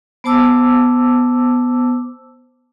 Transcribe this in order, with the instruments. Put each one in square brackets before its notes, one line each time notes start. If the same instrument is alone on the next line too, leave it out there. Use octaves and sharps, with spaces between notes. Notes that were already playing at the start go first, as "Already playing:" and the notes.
[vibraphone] B3 C5 A5 D6 E6